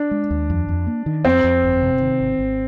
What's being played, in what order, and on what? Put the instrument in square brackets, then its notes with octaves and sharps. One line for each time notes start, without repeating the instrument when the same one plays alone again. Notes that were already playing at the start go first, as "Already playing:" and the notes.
Already playing: [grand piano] D4
[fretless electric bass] G#3
D#2
F2
F2
A#3
D#3
[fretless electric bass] F2 [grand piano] C4
[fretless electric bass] F2
G1
C3
D#3
G#1
G#1